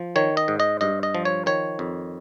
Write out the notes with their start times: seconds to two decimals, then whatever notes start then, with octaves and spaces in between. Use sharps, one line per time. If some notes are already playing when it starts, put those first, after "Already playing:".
Already playing: F3
0.16 D#3 C#5
0.37 D#5
0.48 G#2
0.60 D#5
0.81 G2 D#5
1.03 D#5
1.15 F3
1.25 C#5
1.46 D#3 C#5
1.79 F2